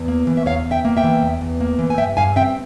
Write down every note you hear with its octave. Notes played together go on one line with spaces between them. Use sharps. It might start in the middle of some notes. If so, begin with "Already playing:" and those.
Already playing: E2
A#3
E3
E5
E2 C#5 F5
E2
E5 G5
A#3
E5 G5
E3
E2
E2
A#3
E3
G#5
G2 E5 G5
G2 F5 G#5
C4 E5 G5